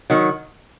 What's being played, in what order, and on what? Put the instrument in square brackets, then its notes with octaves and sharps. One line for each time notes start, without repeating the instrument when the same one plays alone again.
[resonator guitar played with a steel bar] D#3 F#3